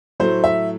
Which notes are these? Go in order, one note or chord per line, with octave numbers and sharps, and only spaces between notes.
A2 F#3 A3 C5
E5